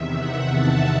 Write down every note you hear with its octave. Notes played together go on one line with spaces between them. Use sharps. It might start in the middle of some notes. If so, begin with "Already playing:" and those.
Already playing: E2 C3 D#3 E5
F#5
A5